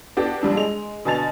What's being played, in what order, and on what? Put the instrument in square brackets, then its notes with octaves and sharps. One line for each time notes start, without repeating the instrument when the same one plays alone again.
[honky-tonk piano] B3 D4 F#4 G4 A4
A#1 G3 D4 A5
G#3 F7
B2 D3 G#5 A5 A6 F7